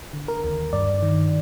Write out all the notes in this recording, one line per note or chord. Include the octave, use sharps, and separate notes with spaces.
D3
A#4
D#2
G2 D5
D#3